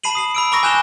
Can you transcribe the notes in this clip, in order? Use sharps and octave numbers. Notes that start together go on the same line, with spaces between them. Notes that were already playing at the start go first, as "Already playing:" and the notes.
A5 B5 C7 D#7 F#7
D#6 C7 F#7
B5 E6 D7
A#5 B5 C#6 D6 E6 A#6
G#5 F#6 G6 E7 F7 G7